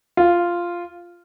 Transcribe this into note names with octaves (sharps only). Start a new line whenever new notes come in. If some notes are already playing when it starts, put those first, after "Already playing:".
F4